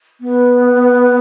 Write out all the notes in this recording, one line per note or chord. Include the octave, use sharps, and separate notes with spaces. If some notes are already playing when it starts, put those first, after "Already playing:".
B3